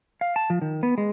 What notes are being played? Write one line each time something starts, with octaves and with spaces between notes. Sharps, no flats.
F5
A5
F3
D#3
B3
G#3